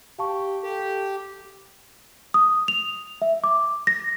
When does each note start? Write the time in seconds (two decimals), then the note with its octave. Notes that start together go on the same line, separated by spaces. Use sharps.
0.19 G4 F5 A5 C#6
0.63 G4 A4
2.34 D#6
2.68 F7
3.22 E5
3.44 D6
3.87 A#6